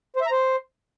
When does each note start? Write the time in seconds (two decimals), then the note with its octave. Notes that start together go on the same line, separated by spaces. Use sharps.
0.16 C5
0.21 E5
0.26 A#5
0.31 C5